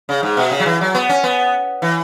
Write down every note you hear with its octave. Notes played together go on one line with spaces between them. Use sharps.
C#3
G#2
B2
C#3
F#3
E3
F#3
B3
C#4
B3
E3